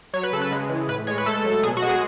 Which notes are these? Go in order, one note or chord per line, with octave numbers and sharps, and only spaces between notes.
F#3 C#5
B4
C#3 A4
B4
G#3
E3
A2 B4
G#3 C#5
B4
A3 A4
F#3
B2 G#4
F#4
G#3
G#4